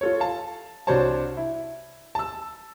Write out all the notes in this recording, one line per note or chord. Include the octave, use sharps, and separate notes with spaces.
F4 A4 C#5
F5 A5
C2 D4 F#4 C5 C#5 A5
E4
A5 E6